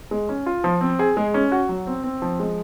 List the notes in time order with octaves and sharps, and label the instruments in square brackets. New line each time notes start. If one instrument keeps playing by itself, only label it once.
[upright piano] G#3
C#4
F4
F3
C4
G#4
G#3
C#4
F#4
F#3
C4
C4
F3
G#3